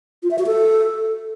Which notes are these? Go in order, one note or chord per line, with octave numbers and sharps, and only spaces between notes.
F4
E5
F#4
A4